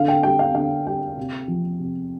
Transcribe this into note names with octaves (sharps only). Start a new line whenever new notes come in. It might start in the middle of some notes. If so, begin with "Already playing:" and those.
Already playing: D3 F5
G5
G3 G5
F5
D3 F5
G3 G5
C3
F3
C3